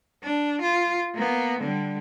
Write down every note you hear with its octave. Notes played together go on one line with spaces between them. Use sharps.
D4
F4
A#3 B3
D3 G3